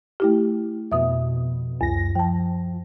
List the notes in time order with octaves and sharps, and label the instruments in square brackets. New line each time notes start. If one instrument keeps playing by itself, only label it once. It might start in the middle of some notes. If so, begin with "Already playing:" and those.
[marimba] A3 E4 G4
[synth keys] F2 B2 [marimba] E5 D#6
[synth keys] C#2 A#6 [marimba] F#2
[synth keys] F3 [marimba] G5 A5